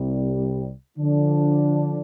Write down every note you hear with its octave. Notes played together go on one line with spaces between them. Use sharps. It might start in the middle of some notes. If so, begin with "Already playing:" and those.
Already playing: C2 C3 G3
D3 F3 D4